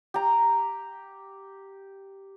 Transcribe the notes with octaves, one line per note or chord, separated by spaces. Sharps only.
G4 A#5